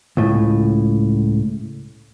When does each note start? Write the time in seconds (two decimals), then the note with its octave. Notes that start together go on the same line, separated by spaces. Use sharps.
0.17 C#2 A2